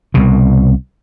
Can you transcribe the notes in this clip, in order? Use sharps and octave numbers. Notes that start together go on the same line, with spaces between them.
C2 B2